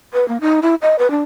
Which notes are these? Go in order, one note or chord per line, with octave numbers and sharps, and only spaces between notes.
B4
A#3
D#4
E4
D#5
B4
D4